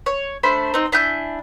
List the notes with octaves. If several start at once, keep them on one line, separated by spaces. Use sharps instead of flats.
C#5
A3 D4 C5 B5
C4 D#4
D4 E4 G#5 G6